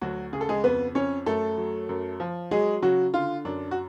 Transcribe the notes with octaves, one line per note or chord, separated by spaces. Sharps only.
D2 F#3 F#4
C#3 G#4
A4
G#3 G#4
F2 B3 B4
F2 C#4 C#5
F#2 A3 A4
F#3
F#2
F3
F#3 G#3 G#4
C#3 F#3 F#4
D3 F4
F#2 D4
F#4